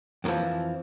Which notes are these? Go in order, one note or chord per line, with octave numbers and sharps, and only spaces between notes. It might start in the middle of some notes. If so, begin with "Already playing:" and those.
F2 A2 D3 E3 F3